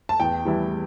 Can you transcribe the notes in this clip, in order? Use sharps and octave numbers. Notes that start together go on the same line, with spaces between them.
A5
E2 G5
E3 G3 E4